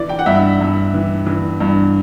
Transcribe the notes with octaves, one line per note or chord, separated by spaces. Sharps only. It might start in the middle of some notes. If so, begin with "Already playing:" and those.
Already playing: E3 D5
G5
F#5
G2 E5
G2
E3
E3
G2